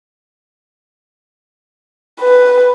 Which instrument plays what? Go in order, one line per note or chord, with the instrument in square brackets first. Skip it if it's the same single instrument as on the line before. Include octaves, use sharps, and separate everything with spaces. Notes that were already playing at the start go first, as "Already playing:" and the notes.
[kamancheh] B4